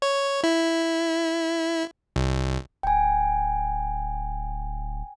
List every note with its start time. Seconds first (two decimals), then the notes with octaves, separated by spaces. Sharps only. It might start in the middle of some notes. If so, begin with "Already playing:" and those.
0.02 C#5
0.44 E4
2.16 C2
2.83 D1 G5 G#5